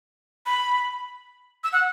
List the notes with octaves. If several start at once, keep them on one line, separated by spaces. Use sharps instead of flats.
B5
E6
F#5